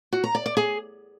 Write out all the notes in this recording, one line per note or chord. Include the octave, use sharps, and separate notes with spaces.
F#4
A#5
D5
D5
G#4